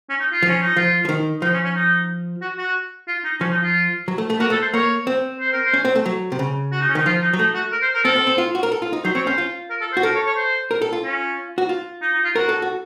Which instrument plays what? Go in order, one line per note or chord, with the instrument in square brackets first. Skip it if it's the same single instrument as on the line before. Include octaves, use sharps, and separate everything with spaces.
[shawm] C#4
D#4
F4
[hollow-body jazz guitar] F3
[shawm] C#4
D#4
[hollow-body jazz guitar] F3 [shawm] F4
[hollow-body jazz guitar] F3
D#3
[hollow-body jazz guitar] F3 [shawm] D#4
[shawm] C#4
C#4
D#4
F#4
F#4
F4
D#4
[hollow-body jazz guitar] F3 [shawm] C#4
[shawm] D#4
F4
[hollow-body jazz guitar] F#3
A3
A3
[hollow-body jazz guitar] A#3 [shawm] F#4
[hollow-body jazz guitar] A3 [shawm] A4
[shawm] C5
[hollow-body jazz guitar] A#3 [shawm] C#5
[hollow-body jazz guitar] C4
[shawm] C5
A#4
C5
[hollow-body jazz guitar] C#4
C4
A3
F#3
C3
C#3
[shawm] F#4
D#4
C#4
[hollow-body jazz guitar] D#3 [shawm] D#4
[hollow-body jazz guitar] F3 [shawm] F4
[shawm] D#4
[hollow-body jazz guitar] F#3
[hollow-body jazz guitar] A3 [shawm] D#4
[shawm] F#4
A#4
C5
A#4
[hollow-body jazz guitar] C4 [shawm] A4
[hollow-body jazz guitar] C4
C4
F4
F#4
A#4
A4
F4
D#4
[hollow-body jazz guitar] F#3 [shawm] C5
[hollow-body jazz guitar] C4 [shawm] C#5
[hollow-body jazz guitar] C#4 [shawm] C5
[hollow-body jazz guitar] F4
[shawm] A#4
A4
C5
[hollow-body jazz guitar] F#4
[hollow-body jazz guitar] A4 [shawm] A#4
[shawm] C#5
C#5
C5
[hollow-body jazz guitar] A#4
A4
F4
[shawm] C#4
[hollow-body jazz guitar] F#4
F4
[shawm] D#4
D#4
F4
[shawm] F#4 [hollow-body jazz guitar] A#4
[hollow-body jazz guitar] A4
F#4